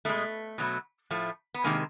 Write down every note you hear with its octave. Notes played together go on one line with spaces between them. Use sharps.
B2 G#3 A3
B2 F#3 A3
A2 F3 A3
B3
C3 D#3 G#3 A#3